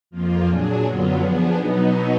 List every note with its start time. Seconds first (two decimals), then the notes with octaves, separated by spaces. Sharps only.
0.10 F2 F3 A#3 F4
0.46 A#2 F#3 D4 G#4
0.82 F#2 D3 F#3 B3 F4
1.18 F3 B3 D4 G#4
1.55 B2 F#3 B3 D#4